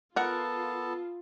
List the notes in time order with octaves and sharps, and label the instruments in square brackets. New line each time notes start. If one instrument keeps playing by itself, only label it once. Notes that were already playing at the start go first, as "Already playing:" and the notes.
[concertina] B3 A4 A5 [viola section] F4 [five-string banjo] A#4 F#5